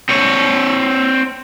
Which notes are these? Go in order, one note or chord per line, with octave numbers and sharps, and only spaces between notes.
C4 C#5